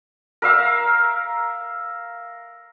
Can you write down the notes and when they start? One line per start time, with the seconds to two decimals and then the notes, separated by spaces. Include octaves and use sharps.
0.42 A#4 E5 F5 E6